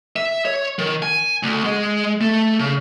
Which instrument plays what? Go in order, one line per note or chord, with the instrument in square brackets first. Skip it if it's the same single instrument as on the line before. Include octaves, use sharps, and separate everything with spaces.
[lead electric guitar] E5
C#5
D#3
G#5
D2
G#3
A3
C#3